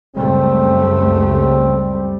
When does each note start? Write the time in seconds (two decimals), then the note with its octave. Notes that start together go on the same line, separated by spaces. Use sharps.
0.16 C#2 F#2 G3 A3 C4